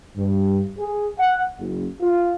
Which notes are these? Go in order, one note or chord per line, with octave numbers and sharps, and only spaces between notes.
G2
G#4
F#5
F#1
F4